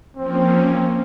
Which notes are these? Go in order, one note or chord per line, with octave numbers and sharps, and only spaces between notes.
F3 A#3 C4 C#4